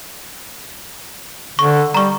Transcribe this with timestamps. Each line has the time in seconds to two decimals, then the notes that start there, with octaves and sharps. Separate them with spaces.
1.59 D3 C#6
1.94 G3 A#5 C#6